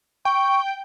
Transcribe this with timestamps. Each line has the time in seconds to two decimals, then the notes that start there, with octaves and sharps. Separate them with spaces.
0.25 G5 C#6